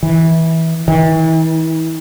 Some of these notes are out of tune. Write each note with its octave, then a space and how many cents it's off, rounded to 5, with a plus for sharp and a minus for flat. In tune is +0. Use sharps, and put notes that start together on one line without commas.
E3 -20
E3 -40